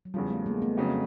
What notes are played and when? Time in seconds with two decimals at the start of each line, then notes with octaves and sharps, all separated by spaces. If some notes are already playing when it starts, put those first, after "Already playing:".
0.05 F#3
0.14 E2 C#3 F3 G3
0.30 A3
0.46 G#3 A#3
0.62 A3 B3
0.77 F2 C#3 F#3